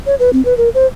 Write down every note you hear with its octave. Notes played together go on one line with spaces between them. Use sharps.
C#5
B4
C4
B4
A#4
C5